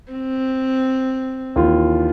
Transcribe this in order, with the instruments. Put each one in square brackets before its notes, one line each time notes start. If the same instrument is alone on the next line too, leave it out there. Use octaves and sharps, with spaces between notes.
[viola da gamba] C4
[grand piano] D#2 E3 F4